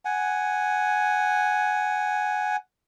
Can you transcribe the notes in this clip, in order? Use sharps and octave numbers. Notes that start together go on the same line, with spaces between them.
F#5 G#5